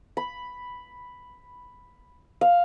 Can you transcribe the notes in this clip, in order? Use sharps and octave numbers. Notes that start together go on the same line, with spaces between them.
B5
F5